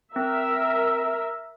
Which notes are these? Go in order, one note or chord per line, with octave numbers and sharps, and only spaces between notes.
C4 A#4 E5